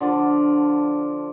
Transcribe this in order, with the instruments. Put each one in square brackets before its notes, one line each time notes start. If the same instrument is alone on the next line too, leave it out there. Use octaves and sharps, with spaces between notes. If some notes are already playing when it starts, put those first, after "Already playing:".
[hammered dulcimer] D3 F3 D5